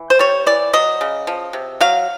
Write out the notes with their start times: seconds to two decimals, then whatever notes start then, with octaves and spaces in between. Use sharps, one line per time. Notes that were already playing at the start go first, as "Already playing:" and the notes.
Already playing: E3
0.10 C5
0.19 G3 C#5
0.46 E3 D5
0.73 F#3 D#5
1.01 C#3
1.27 F3
1.53 C3
1.81 F#3 F5